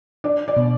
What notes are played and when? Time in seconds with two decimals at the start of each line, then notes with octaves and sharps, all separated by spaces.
0.24 D4 D5
0.48 D5
0.56 B2